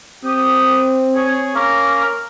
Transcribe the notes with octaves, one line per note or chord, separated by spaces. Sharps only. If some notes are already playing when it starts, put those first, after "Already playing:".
C4 G4 D#6
G#4 C#5
A#3 C#4 A#4